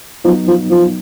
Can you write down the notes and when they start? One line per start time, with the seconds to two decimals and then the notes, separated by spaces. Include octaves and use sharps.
0.25 F3 F#3 B3 D#4
0.47 F3
0.71 F3